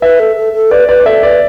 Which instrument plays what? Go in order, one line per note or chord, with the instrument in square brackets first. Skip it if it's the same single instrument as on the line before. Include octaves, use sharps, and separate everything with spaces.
[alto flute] B4 [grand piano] E5
[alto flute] A4
A4
A4
[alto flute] B4 [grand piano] D5
[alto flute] B4 [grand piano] D5
[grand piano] D5
[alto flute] A4 [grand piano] E5
[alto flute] B4 [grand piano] D5